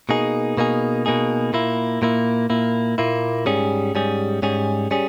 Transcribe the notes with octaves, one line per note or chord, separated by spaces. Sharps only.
B2 A#3 D#4 G#4
B2 A#3 D#4 G#4
B2 A#3 D#4 G#4
A#2 A#3 E4
A#2 A#3 E4
A#2 A#3 E4
A#2 A#3 E4
G#2 G3 C#4 G#4
G#2 G3 C#4 G#4
G#2 G3 C#4 G#4
G3 C#4 G#4